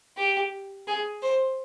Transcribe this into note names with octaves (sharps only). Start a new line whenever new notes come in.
G4
G#4
C5